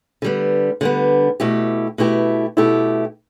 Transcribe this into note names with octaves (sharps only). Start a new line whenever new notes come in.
D3 G3 B3
D3 G3 B3
B2 A3 E4 G4
B2 A3 E4 G4
B2 A3 E4 G4